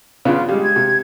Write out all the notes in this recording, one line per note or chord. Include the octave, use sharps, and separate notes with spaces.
C#3 B3 D4 F4
G3 G#3 F5
G#6
C3